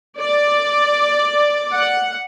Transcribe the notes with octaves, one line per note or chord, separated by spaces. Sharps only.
D5
F#5